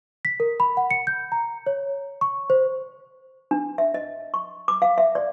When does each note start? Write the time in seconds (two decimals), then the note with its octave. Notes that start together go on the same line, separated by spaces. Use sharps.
0.25 B6
0.40 A#4
0.60 B5
0.77 F#5
0.91 C#7
1.07 G6
1.32 A#5
1.67 C#5
2.21 C#6
2.50 C5
3.51 D4
3.78 E5
3.94 D#5
4.34 C#6
4.68 D6
4.82 F5
4.98 E5
5.15 D5